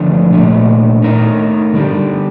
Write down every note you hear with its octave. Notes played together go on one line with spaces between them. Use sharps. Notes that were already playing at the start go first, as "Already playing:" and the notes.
Already playing: D3 F3 A3 D4 F4
A#2 A3 D4
A3 D#4 A#4
D3 G3 D4 G4